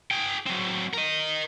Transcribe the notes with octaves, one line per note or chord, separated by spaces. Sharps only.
G#4 G5
F#3 C4
A#4 D#5